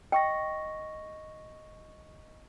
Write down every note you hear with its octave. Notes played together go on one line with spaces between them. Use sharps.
D#5 G5 C#6 A#6